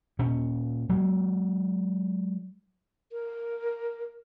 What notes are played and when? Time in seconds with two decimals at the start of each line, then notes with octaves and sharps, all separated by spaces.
0.19 A#2 C#4
0.89 F#3 G#3 A#3
3.11 A#4